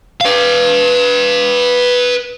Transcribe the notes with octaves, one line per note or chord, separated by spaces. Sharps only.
B4 F5